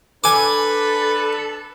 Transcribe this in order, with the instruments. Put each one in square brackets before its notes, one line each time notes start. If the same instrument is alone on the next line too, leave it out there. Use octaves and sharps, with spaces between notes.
[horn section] D4 B4 [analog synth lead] A4 [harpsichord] G#5 D6